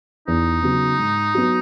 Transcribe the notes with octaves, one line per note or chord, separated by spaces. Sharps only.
E2 D#4
C#3 F#3 B3
G#2
F#3 B3